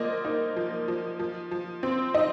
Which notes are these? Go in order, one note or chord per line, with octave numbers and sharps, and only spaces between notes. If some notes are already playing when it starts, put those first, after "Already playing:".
Already playing: F3 A#3 C5 D5 D#5
D#4
F3
F3
F3
F3
C4
D#4 D#5